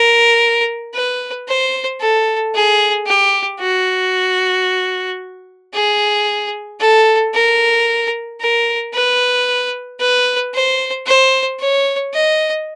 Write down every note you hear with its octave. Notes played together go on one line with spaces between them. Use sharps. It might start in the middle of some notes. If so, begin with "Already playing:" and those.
Already playing: A#4
B4
C5
A4
G#4
G4
F#4
G#4
A4
A#4
A#4
B4
B4
C5
C5
C#5
D#5